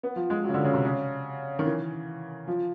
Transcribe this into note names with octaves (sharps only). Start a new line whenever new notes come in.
B3
F3
G#3
F#3
C#3
D3
C#3
C3
C#3
D#3
E3
F3